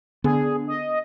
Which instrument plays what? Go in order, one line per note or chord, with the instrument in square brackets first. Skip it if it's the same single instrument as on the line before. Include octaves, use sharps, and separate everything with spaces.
[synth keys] D3 [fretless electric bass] B3 [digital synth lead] G#4
[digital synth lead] D#5